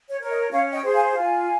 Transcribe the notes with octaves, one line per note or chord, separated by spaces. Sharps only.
C#5
A#4 C#5
D#5
C#4 C#5 F5
D#5 G5
G#4 C5
F5 G#5
F4 F5 G#5